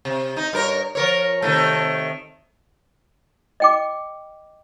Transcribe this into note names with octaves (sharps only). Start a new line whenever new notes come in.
C3
D#4
G2 A#4 C#5
F3 A#4 C#5
C3 D#3 A3
D#5 G5 D6